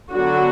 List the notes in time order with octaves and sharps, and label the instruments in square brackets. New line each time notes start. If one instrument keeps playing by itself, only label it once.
[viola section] D3 F#3 B3 F#4